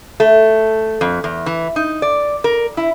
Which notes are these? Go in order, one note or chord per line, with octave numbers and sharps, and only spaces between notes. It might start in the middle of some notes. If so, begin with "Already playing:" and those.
A3
F2
E2
E3
D#4
D5
A#4
E4